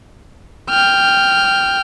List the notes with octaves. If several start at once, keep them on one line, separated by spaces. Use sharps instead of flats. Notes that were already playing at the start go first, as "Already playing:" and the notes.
G5 F6